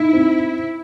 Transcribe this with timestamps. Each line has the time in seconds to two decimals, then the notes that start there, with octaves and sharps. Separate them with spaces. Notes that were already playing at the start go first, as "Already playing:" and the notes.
Already playing: D#4 E4
0.13 C4